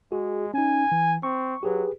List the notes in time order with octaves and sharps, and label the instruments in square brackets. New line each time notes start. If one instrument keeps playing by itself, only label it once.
[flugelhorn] G#3 [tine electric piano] F#4 G#4
[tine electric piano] C#4 D#4 [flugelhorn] G#5
[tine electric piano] E3
[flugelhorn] C4 [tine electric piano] C#6
[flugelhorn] F#3 [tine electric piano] G4 G#4 B4